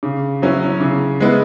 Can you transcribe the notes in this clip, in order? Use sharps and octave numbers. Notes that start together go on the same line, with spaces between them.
C#3
F#3 C#4 E4
C#3
G#3 B3 E4